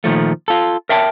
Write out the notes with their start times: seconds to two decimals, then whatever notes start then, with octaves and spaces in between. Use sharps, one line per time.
0.04 A#2 D#3 F3 A3
0.48 F4 A4
0.89 A#4 E5 G5 A5